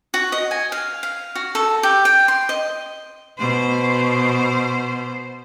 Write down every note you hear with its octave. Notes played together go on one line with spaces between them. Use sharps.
F#4
D#5
G#5
F5
F5
F#4
A4
G4
G5
C6
D#5
B2 C5